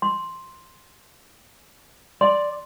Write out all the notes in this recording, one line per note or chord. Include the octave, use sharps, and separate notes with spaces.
C6
D5 C6